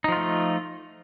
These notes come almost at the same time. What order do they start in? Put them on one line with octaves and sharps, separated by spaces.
D#4 F3 F4 A3